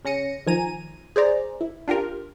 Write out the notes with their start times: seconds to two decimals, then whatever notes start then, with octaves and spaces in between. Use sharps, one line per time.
0.05 C#3 C#4 A#6 C#7 D#7
0.46 D#3 F3 G#5 A#5 D#7
1.16 G#4 C5 D5 A#5
1.61 E4
1.88 D4 F4 G4 A#4